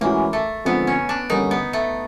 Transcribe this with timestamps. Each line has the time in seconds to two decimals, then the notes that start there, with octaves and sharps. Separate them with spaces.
0.01 A2 E3 G#3 A#3 C#4 F#4
0.33 A3
0.65 D3 F3 G#3 B3 C4 D#4
0.87 C#4
1.09 D4
1.30 D#2 D3 G3 A#3 C#4 D#4
1.51 B3
1.73 A3